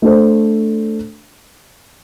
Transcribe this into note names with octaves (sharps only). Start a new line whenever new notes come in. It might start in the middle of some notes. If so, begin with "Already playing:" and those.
A3 D4 A4 C5